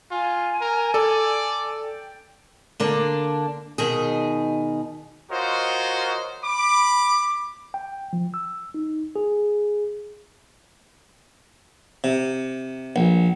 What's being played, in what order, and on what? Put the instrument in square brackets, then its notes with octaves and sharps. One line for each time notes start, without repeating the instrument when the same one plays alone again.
[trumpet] F4 [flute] G#5
[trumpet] A#4
[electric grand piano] A4 [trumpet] D5
[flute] G5
[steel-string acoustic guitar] D3 A#3 D4
B2 D#3 G#4
[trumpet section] F4 F#4 A#4 C5 C#5 D#5
B5 D6
[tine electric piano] G5
F3
E6
D#4
G#4
[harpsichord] C3
A#1